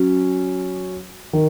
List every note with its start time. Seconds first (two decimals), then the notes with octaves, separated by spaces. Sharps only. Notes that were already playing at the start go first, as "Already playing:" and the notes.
Already playing: F#3 C#4
1.33 D#3